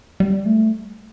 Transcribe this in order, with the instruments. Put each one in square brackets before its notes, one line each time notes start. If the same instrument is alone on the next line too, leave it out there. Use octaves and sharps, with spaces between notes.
[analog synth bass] G3
A3